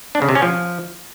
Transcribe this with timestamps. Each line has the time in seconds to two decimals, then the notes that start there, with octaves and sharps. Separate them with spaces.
0.15 D4
0.22 C#3
0.29 C3
0.35 C#4
0.42 F3